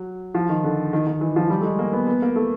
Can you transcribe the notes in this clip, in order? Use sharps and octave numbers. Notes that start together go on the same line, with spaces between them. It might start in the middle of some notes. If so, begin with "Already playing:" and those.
Already playing: F#3
F3
D#3
D3
D#3
D#3
E3
F3
G3
A3
G#3
A#3
B3
B3
A#3
A3